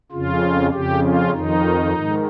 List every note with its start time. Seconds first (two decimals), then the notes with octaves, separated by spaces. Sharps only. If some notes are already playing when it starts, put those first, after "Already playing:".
0.12 F2 C#3 F4
0.72 F2 C#3 G4
1.03 F4
1.33 F2 D#3 D#4
1.94 G#2 D#3